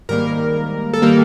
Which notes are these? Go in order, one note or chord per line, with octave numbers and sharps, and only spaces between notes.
G#2 D#3 G3 A#3 A#4
A4
D#3 G3 A#3 A#4